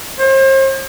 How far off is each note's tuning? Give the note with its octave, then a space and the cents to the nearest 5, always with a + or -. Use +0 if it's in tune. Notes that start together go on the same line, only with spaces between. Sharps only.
C5 +40